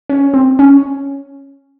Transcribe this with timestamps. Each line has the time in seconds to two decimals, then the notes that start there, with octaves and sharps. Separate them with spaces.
0.10 C#4
0.34 C4
0.59 C#4